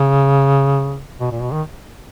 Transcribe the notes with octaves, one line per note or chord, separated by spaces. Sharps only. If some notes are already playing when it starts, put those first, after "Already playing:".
Already playing: C#3
B2
A#2
B2
D#3